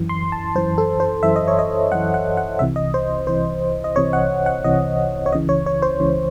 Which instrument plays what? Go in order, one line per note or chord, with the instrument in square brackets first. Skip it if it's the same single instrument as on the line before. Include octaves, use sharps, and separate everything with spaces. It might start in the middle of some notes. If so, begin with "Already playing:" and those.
Already playing: [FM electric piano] F#2 E3
C6
A5
F#2 E3 C5
A4
C5
F#2 E3 E5
D#5
C#5
D#5
F#2 E3 F#5
F#5
F#5
C2 C3 E3 E5
D#5
C5
C2 C3 E3 C5
D#5
C2 C3 E3 C#5
F#5
F#5
C2 C3 E3 D#5
C#5
C#2 C#3 E3 D#5
C#5
C#5
C5
C#2 C#3 E3